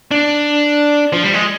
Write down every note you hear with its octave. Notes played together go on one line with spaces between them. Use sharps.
D4
F3
G3
G#3